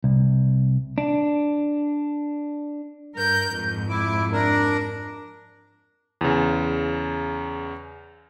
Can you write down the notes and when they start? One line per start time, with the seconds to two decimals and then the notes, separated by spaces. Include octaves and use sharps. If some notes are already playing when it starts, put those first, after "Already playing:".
0.04 C2
0.98 D4
3.14 G2 A#4 G6
3.52 F2 G#2
3.89 E4 D6
4.33 D4 A#4
6.21 E2 C#3